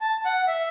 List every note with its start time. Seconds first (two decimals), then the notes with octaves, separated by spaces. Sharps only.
0.01 A5
0.25 F#5
0.47 E5